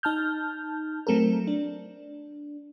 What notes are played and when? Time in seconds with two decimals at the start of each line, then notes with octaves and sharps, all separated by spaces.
0.03 D#4 A5 F6 G6
1.07 F#3 A3 C4 A4 A#4
1.47 D4